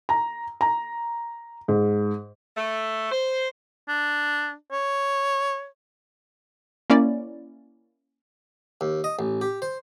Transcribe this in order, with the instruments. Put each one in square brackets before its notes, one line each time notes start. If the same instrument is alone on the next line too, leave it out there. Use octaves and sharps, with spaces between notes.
[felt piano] A#5
A#5
G#2
[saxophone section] A3
C5
[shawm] D4
C#5
[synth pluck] A#3 C#4 E4 D5
[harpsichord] D#2
D#5
A1
G4
C5